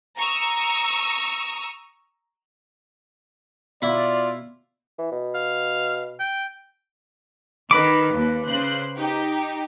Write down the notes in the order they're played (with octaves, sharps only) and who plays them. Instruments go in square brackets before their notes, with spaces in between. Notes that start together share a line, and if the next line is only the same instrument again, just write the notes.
[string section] A#5 C#6 D#6 E6
[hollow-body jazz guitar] B2 [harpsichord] E4 B5 [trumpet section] F4 D5
[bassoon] E3
B2
[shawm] F5
G5
[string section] D#3 [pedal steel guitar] B4 B5 D6
[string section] D#2
C#3 C5 F#6
D#4 G4